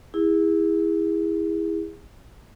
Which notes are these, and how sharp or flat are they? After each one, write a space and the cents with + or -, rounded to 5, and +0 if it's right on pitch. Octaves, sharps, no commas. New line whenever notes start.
E4 -10 G#4 -30